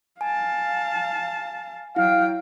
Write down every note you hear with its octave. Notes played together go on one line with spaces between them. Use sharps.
F5 G#5 A5
F#3 E4 F5 G5